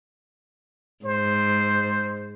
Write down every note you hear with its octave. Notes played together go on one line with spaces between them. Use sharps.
G#2 C5